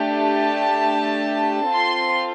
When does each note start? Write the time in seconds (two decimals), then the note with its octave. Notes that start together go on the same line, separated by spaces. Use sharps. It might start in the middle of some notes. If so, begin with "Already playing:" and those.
Already playing: A3 D4 G4
0.14 A5
1.71 C4 F4 A4 C6